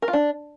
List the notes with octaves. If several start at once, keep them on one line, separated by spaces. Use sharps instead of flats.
A#4
F4
D4